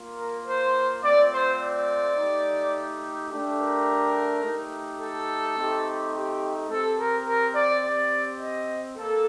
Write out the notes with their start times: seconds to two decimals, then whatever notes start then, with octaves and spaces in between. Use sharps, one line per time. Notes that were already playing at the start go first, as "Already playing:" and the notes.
Already playing: A#3 F4
0.17 A#4
0.47 C5
1.03 A3 C4 F4 D5
1.32 C5
1.60 D5
2.17 A3 D#4 G4
3.30 A3 D4 G4
3.59 A#4
4.43 A3 D#4 G4
5.01 A4
5.57 A3 C4 D#4 G4
6.14 G4
6.70 C4 G4 A4
6.98 A#4
7.26 A#4
7.55 D5
7.83 C4 G4 D5
8.41 D#5
8.97 A#3 A4